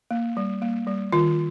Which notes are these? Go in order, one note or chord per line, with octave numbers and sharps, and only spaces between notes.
A#3
G3
A#3
G3
D#3 F4